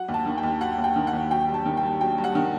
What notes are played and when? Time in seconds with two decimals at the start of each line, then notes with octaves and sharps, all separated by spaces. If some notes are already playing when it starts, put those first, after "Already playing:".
Already playing: F#3 F#5
0.08 D#2
0.14 A5
0.26 D#3
0.37 G5
0.43 D#2
0.61 F#3 F#5
0.78 D#2
0.84 G5
0.96 D#3
1.07 F#5
1.13 D#2
1.31 F#3 G5
1.48 G2
1.54 A5
1.66 D#3
1.77 G5
1.83 G2
2.01 F#3 G5
2.18 G2
2.24 F#5
2.35 D#3